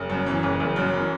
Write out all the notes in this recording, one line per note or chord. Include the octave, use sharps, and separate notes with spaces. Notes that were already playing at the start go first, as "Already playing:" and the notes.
Already playing: F#1
F#2
E3
F#1
F#1
F#2
E3